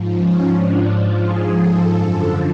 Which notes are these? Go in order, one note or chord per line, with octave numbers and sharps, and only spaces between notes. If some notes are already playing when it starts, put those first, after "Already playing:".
Already playing: G#2 F3
C#4
G#2 F3 D4
F4
G#2 F3 G#4
A4
F#2 D3 F3